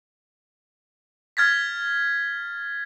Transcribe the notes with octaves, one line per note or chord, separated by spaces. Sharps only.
F6 G#6 A6 B6